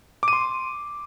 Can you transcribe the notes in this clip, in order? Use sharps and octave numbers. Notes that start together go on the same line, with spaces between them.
C6 D6 D#7